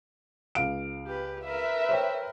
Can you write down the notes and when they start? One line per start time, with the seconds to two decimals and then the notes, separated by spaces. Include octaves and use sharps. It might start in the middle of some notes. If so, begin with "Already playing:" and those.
0.55 C#2 F5 D7
1.07 G4 B4
1.45 A#4 B4 E5
1.89 C5 C#5 G5